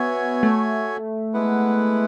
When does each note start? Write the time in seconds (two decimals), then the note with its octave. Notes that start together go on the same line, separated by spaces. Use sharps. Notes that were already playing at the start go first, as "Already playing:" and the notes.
Already playing: B3 F#4 C#5 E5 G#5
0.43 A3
1.33 G#3 B3 E4 B4 F#5